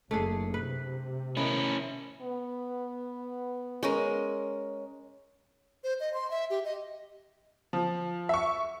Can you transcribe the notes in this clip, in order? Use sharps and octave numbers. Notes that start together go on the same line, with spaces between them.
F#1 A3 D4 G#4
C3 B4
D#3 B3 C#4 E4
B3
G#3 C#4 A#4
C5
D#5
C6
E5
G4
D#5
F3
E5 C#6